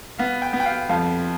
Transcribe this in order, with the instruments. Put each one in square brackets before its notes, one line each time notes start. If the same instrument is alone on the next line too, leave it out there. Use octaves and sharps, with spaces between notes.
[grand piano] B3 F5
G5
B3
G5
F5
F2 F5